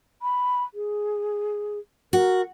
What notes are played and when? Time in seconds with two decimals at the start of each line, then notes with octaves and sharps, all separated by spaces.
0.22 B5
0.74 G#4
2.13 F#4 A#4